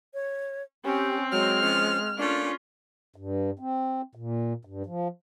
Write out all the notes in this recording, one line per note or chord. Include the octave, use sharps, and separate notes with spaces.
C#5
C4 C#4 G4
F#3 G#3 F6
F3 C#4
A3 A#3 C#4 D4 F4
G2
C4
A#2
G2
F3